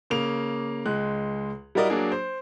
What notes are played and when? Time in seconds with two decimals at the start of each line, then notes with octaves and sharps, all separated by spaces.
0.10 C#3 A#3 F7
0.86 C#2 G#3 F#6
1.75 G3 E4 F#4 A#4 D5 D#5
1.90 F#3 A#3 D4 G#4
2.12 C5